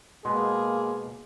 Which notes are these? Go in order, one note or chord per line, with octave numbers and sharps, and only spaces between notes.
B2 G#3 A#3 B3 G#4 C6